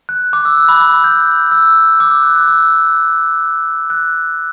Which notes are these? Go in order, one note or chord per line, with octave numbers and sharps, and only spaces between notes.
F#6
D6
E6
F#6
B5
B5
B5
G6
E6
D6
E6
F#6
F#6
E6
F#6